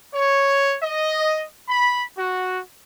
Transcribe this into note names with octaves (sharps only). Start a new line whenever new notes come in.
C#5
D#5
B5
F#4